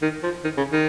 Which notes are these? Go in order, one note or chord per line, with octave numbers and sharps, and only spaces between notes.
D#3
F3
D#3
C#3
D#3